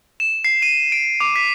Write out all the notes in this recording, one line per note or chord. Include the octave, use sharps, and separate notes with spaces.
E7
C7
D#7
D7
D6
B6